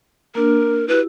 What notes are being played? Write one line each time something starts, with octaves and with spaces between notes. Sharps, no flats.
A#3 D4 A#4
E4 F#4 G4 B4